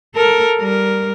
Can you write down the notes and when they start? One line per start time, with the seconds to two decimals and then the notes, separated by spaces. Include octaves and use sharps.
0.15 A4 A#4
0.57 G3 A#4